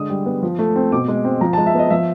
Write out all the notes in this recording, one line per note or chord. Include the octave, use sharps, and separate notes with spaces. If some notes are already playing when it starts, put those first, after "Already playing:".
Already playing: D3 G#3 D#6
G3
B3
F3
A3
C4
B2 D6
G#3
C4
F3 A#5
G#3 A5
E5
B3 D#5
F3 E5